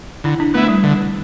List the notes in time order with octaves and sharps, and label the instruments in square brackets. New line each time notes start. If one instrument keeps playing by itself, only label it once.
[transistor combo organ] D3 [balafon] E4
[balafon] D4
[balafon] A3 [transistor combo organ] B3 E4
[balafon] G3
[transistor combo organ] D3